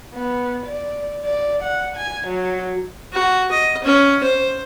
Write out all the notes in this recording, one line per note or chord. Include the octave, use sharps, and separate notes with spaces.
B3
D5
D5
F#5
G#5
F#3
F#4
D#5
C#4
C5